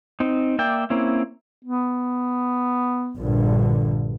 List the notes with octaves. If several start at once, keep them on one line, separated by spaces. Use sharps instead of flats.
C4 D#4
A#3 D5 E5 G5
A#3 C4 C#4 E4
B3
A#1 G2 D3